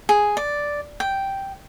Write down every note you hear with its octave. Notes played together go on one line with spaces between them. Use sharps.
G#4
D5
G5